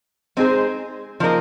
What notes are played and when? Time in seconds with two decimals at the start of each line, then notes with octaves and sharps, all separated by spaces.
0.37 G#3 C4 D#4 G#4 C5
1.20 F3 A#3 D#4 A#4 D#5